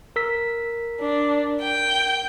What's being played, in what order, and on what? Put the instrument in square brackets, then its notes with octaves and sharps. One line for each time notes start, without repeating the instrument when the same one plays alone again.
[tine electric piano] A#4 E6 B6
[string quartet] D4
G5